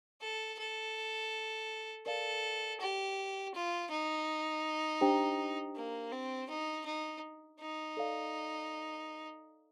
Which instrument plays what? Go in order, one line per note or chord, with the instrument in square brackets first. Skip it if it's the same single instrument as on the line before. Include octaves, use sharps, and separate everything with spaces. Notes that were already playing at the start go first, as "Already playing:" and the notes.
[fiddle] A4
A4
[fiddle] A4 [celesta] A#4 D5 F5
[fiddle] G4
F4
D#4
[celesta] D4 G4 C5 G5 A#5
[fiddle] A#3
C4
D#4
D#4
D#4
[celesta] A4 D5 F5